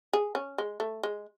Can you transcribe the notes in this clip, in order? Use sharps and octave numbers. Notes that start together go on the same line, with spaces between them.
G#4
C#4
G#3
A3
G#3